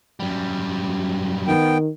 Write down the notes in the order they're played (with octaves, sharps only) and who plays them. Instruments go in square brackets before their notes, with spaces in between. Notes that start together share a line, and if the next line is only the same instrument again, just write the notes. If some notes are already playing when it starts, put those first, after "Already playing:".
[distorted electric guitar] F#2 G3
[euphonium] D#3 [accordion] B3 G5